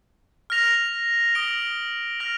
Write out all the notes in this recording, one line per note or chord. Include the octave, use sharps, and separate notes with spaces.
F6 A#6 F7
D#6 A#6 D7 G7
F6 A#6 F7